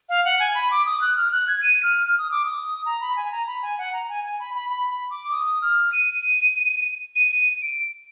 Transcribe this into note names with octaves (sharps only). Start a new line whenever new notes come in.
F5
F#5
G#5
B5
D6
D#6
F#6
F6
F#6
G#6
D#7
F6
F6
D#6
D6
D#6
A#5
B5
G#5
A#5
B5
G#5
F#5
A#5
G#5
G#5
B5
B5
B5
B5
D6
D#6
F6
D#7
D#7
D#7
D7